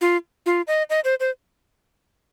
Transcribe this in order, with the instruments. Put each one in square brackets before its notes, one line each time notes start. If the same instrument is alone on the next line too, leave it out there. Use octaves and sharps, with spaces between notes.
[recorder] F4
F4
D#5
D#5
C5
C5